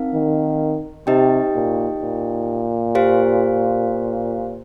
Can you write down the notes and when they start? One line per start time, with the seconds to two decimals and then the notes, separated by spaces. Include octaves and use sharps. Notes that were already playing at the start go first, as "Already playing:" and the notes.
Already playing: C4 D#4 A#4 F5
0.14 D#3
1.07 C3 D#4 G4 D#5 G5
1.55 A#2
2.01 A#2
2.95 G4 C5 F5